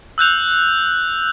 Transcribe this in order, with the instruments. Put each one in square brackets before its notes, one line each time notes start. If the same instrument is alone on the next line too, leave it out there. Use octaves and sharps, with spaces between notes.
[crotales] E6 F#6 G6 F7